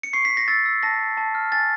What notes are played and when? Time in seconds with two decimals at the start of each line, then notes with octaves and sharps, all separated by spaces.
0.03 C#7
0.13 C#6 C7
0.25 B6
0.31 C#6
0.37 A#6
0.48 E6 A6
0.66 E6
0.83 A5 A#6
1.00 A5
1.17 A5
1.35 F6
1.52 G#5 A6